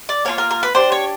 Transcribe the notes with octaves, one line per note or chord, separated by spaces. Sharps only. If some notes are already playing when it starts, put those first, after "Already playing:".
D5
A#3 D4 F4 C#5
A#4
A#4
B4
D4 G4 C5
C#5